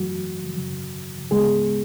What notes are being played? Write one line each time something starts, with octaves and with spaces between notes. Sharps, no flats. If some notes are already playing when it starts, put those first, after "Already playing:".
Already playing: F#2 E3 F#3 A3 F#4
F#2 C#3 F#3
D2 C#3 G#3 B3 G#4